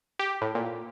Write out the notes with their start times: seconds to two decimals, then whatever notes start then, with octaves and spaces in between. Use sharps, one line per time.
0.19 G4
0.42 A2
0.55 A#2